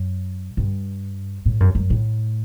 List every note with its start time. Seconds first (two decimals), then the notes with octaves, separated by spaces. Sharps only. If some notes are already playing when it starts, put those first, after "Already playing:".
Already playing: F#2
0.57 G2
1.46 A2
1.60 F#2
1.75 F#2
1.90 A2